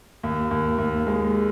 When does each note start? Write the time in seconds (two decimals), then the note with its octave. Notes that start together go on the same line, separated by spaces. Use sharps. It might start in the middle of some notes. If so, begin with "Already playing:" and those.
0.23 D#2
0.51 D#2
0.78 D#2
1.07 G#3